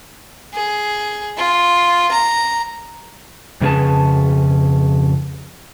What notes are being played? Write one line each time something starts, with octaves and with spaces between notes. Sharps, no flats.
G#4
F4
A#5
F2 C#3 C#4 G#4 B4 A5